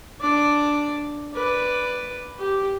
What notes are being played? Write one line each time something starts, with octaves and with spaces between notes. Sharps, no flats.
D4 D5
B4 D5
G4